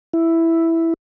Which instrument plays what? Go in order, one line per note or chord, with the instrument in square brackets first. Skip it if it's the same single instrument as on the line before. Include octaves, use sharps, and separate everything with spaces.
[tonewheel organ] E4